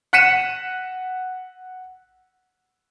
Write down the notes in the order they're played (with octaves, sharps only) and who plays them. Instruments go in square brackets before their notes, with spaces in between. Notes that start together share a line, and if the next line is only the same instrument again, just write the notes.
[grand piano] F#5 F#6 B6 C#7 D#7 E7